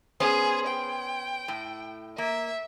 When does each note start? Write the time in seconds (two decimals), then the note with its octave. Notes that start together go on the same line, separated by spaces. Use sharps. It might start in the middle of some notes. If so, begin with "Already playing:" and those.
0.20 B3 C#4 G#4 C5
0.67 G5
1.48 A2
2.18 A#3 E5